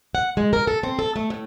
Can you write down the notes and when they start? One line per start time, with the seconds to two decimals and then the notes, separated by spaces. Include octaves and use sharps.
0.15 F#5
0.37 G#3
0.53 A#4
0.67 A4
0.83 C4
0.99 A4
1.16 A3
1.30 A2